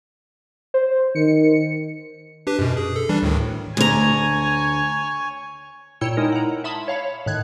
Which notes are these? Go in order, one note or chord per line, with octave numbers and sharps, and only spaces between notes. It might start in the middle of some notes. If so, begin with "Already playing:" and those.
C5
D#3 C#7
D4 G4 B4
F#2 B2
G#4
A4
E3 G3 D4
D2 A2 D#3
D2 C#5 G#5 A#5
A#2 E4 C#5 G5 E6 C#7
G#3 D#4 E4 A#4
F#5 A#5
E5 A5 B5 C6 D#6
C#5 F5 B5
A2 D#3 F#6 G#6